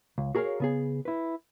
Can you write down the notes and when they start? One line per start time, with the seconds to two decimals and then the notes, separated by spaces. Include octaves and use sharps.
0.18 C#2
0.35 F#4 G#4 A#4 C#5 F5
0.60 C#3 B3 G#4
1.05 E4 B4